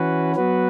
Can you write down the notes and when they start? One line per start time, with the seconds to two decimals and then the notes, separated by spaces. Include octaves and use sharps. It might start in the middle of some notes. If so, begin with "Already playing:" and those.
Already playing: E3 C#4 F#4 B4
0.36 F#3 B3 F#4 B4